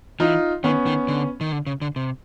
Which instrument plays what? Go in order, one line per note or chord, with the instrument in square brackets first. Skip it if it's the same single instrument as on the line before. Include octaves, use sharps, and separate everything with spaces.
[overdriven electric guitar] E3 [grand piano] D#4 F4
[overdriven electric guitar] D#3 [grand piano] B3 C#4
[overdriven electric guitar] D#3
D3
D#3
D3
C#3
D3
C3